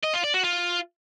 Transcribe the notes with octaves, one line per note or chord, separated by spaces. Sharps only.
D#5
F4
D5
F#4
F4